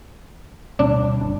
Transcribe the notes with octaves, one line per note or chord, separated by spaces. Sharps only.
D2 B2 G3 D4
F#1 D4